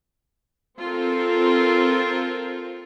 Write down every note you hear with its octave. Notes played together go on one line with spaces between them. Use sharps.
C4 F4 A4 A#4